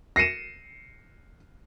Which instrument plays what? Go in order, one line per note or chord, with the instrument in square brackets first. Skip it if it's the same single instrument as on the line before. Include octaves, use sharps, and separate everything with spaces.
[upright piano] A#6 C7 C#7 D#7 E7